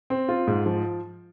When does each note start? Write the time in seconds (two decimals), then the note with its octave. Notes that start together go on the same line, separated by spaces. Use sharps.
0.10 C4
0.29 F4
0.47 G#2
0.66 F3